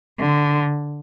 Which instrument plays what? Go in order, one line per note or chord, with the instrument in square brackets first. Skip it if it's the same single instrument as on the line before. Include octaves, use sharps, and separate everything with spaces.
[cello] D3